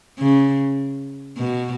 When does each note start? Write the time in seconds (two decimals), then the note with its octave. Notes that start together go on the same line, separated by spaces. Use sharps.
0.19 C#3
1.37 B2